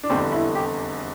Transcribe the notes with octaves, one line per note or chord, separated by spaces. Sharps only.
D4
F1 E2 D3 G3 C4
E4
G4